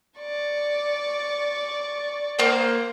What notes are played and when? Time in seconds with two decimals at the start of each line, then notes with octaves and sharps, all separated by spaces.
0.19 D5 C#6
2.39 A#3 C5